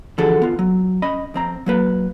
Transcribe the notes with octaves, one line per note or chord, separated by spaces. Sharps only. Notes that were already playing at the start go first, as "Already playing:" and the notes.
D3 E3 F3 F#4 G#4 A4
B3 F4
F#3
C#4 D#5 B5
F2 C4 A#5
F#3 A#3 B4